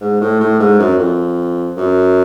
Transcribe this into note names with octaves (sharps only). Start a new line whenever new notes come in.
G#2
A2
A2
G#2
F#2
F2
F#2